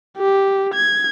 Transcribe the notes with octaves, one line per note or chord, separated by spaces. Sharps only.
G4
G#6